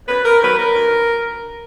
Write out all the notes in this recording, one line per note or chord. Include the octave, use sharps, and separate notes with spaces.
F#2 B4
A#4
D#3 F#3 B4
A#4
D2